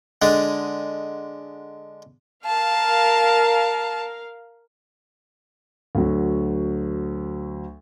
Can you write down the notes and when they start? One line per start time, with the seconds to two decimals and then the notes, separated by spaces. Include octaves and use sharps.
0.22 D3 G#3 D4
2.46 A#4 F5 A5
5.95 D2 F#3